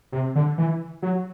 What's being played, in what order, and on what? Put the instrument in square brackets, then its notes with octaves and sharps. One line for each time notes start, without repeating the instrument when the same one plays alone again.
[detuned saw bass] C3
D3
E3
F#3